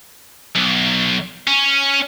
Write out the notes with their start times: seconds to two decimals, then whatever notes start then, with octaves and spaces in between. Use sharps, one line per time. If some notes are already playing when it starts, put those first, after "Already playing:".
0.55 B1
1.47 C#4